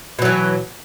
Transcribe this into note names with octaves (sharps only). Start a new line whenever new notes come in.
B2 E3 F#3